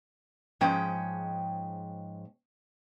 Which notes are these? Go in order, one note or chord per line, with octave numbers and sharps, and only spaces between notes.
G#2 F3 G#3 C#4 G5